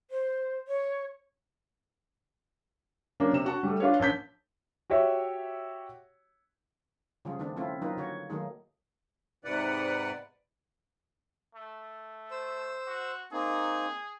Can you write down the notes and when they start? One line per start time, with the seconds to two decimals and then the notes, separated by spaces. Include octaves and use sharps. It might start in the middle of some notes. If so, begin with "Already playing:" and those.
0.11 C5
0.68 C#5
3.20 F#3 A#3 C#4 D4
3.33 C3 E7
3.45 F#4 F#5 A5 C#6
3.63 G3 A3
3.80 D4 F4 B4 C#5
3.99 A#1 C#4 A5 G6 B6
4.90 F#4 G4 C#5 E5
7.25 C#3 F3 G3 F4 G#4
7.38 D#3 A3 B3 C4 D4
7.56 F3 A3 C4 C#4 E4 F4
7.81 F3 F#3 A#3 D#4 F4 B4
7.97 D3 F#4 C#5
8.30 D#3 F#3 A3 A#3 D#4 G#4
9.44 G#2 C3 B3 B4 D5 F#5
11.55 A3
12.31 C5 E6
12.87 F#4
13.33 A#3 C4 D#4 G#4